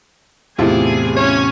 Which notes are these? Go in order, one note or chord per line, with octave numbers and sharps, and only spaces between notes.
E2 A2 C3 E4 F4 G#4 G#5 A5
C#4 C#5 G#5